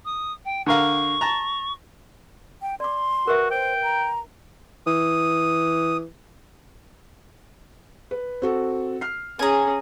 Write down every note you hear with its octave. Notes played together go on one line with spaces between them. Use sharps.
D#6
G5
D3 A#4 F5 C#6
A5 A#5
G5
D5 C6 D6
F#4 A#4 B4 E5
C5 G5
A#5
E3 D#6
B4
C4 F#4 A4
F6 C7
C#4 G#4 G#5 A#5